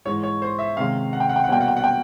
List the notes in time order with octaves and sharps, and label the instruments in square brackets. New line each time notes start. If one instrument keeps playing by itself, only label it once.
[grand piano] G#2 E3 G#3 C#5
C#5
C5
E5
C3 D#3 G#3 C#4 F5
F#5
G5
F#5
G5
F#5
B2 G3 A#3 C#4 G5
F#5
G5
F#5
G5